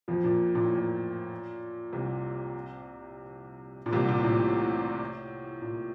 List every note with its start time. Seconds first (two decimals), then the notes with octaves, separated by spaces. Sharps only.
0.08 F2 F3
0.24 A#2
0.55 A#2
0.64 A2
0.75 A#2
1.93 C2 C3
3.86 A#2
3.92 C2 C3
4.08 A#2
4.19 A2
4.24 A#2
4.39 A2
4.58 A2
5.62 A#2